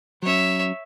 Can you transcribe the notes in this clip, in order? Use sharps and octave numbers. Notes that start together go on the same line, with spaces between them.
F#3 C#4 C#5 E5